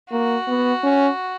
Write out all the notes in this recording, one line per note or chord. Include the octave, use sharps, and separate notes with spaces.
A#3 F#4
B3
C#4